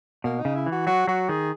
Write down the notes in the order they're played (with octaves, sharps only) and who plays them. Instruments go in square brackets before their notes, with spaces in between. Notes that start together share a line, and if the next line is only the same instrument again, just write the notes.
[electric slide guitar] B2 [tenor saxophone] A#3
[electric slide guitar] C#3 [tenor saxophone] D#4
[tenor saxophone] E4
[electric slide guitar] E3
[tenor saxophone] F#4
[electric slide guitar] F#3 [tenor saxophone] F#4
[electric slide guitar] F#3 [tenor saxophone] F#4
[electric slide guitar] D#3 [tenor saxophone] G#4